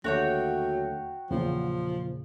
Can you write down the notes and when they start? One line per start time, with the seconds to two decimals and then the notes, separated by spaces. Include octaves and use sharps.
0.04 D#2 D3 F#3 A3 F#4 C#5 G5
1.31 E2 A#2 C#3 F3